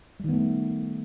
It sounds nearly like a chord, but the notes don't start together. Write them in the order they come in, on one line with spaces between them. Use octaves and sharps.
G3 D#3 B3 A3